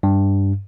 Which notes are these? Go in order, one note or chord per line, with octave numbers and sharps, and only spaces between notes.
G2